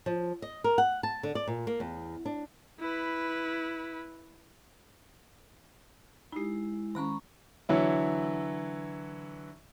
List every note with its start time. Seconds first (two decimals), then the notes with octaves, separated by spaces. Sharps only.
0.06 F3
0.42 D#5
0.64 A#4
0.78 F#5
1.03 A5
1.23 D3
1.35 D5
1.47 A#2
1.67 A#3
1.80 E2
2.25 D4
2.79 E4 B4
6.32 G#3 D#4 E4 G4
6.95 D#3 G#3 C#4 A#5 B5 C#6
7.69 D3 E3 F#3 E4